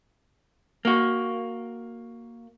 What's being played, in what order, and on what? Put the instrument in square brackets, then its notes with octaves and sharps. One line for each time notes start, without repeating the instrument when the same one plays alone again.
[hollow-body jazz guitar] A#3 F#4